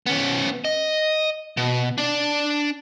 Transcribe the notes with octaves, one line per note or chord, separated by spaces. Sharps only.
B3 C#4
D#5
B2
D4 D5